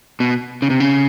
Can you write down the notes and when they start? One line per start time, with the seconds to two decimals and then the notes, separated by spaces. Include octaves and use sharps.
0.20 B2
0.62 C#3
0.70 C3
0.80 C#3